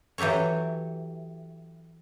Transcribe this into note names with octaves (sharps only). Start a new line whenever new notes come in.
E3 F#3 G4 A4 C#5